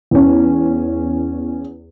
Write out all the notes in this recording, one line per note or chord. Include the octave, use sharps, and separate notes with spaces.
E2 C#4